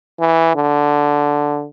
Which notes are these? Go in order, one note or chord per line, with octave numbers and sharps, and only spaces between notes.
E3
D3